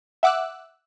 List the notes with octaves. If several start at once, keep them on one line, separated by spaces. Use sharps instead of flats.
E5 F#5 D6 E6 F#6